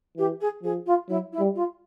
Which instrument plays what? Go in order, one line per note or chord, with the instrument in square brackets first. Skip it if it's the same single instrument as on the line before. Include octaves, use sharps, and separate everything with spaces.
[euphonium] E3 [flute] G4
[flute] G#4
[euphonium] F3 [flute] G#4
[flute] F4
[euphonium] F#3 [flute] E4
[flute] E4
[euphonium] G3
[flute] F4